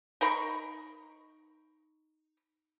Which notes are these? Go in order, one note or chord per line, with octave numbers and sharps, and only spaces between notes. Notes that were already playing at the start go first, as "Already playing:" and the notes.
D#4 A#4 B5 C#6